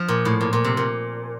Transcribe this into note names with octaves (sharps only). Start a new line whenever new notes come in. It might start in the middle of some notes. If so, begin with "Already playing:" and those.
Already playing: F3
A#2
A2
A#2
A#2
C3
A#2